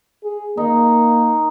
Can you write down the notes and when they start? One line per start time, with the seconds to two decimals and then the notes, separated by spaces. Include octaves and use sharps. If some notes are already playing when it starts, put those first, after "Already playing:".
0.24 G#4
0.57 A#3 D#4